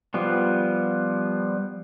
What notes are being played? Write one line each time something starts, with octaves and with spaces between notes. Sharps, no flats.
F3 G3 B3